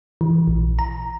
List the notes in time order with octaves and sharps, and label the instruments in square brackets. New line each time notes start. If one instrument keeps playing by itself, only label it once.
[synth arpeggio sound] E3
A#1
A#5